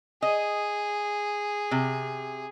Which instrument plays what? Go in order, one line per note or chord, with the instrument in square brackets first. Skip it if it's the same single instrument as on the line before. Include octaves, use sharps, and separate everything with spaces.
[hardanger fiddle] G#4 [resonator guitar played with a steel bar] D#5
[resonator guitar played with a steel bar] C3